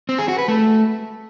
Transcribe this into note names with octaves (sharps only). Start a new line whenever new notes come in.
C4
G#4
F#4
B4
A3